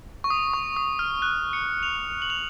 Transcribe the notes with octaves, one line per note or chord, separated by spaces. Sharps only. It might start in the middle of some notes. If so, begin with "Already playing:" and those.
C#6
D#6
C#6
D#6
F6
F#6
C#7
F7
F#7
F7